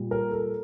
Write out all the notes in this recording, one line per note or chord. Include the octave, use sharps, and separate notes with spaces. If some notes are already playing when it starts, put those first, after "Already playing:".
Already playing: A#2 G3
A#4
A4